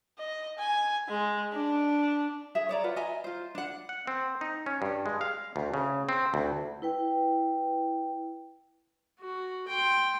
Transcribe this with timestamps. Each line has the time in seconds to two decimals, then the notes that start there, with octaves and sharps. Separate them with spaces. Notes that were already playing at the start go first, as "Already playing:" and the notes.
0.18 D#5
0.59 G#5
1.08 G#3
1.53 D4
2.55 G#4 E5
2.69 C#5 D5 A#5
2.84 F4 B4 F#5
2.96 D#5 E5 G#5 A#5
3.24 F4 C5
3.55 D4 F#5
3.89 F#5
4.07 C4
4.41 D#4
4.66 C#4
4.82 G2
5.06 G#3
5.21 F5
5.56 D2
5.74 C#3
6.09 C4
6.34 D2
6.82 E4 B4 G5
9.19 F#4
9.68 G5 C6